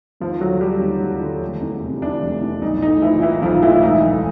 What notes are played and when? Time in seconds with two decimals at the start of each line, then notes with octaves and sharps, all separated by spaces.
0.20 D#2 F3 F4
0.41 D3 F#3 F#4
0.61 G3 G4
0.81 D#2
1.01 D#2
1.21 D3
1.42 F1
1.61 E2
1.81 C3
2.02 E3 D4
2.22 F1
2.41 E2
2.62 B1 D#4
2.82 A2 D#4
3.02 E3 F3 E4
3.22 E3 A#3 E4
3.42 B1 F3 F4
3.62 A2 E3 E4
3.74 E4
3.82 E1 D#4
4.03 D2